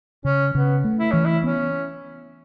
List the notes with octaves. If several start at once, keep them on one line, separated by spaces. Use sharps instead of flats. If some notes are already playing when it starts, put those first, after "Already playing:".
C#3 C#4
C#3 B3
A3
E4
E3 C#4
E4
B3 C#4